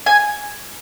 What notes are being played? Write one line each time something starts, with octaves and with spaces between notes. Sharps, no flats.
G#5